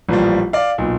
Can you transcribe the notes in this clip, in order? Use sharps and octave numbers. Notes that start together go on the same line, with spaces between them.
A1 A#2 F3 G3
D5 F5
B1 A#2